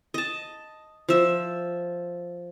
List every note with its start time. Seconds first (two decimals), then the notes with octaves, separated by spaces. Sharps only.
0.14 D#5 A5
1.09 F3 E5